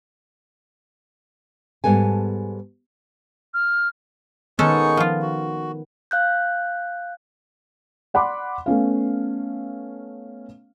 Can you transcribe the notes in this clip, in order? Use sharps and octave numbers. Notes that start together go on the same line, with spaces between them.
G#2 G3 B3 A4 G#5
F6
D#3 G#3 B3 C#4 D#4 G#4 A4 C#6
F3 F4
F#4
F5 F#6 G6
D5 F#5 B5 C6 D6
A3 B3 C#4 F5